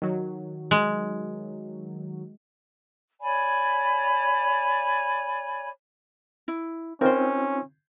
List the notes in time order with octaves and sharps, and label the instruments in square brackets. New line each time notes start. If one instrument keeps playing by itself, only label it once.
[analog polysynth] D#3 F#3
[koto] G#3
[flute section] C#5 D5 G#5 B5
[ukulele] E4
[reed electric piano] C4 D#4 F4 [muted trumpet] C#4 [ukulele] A#4 C5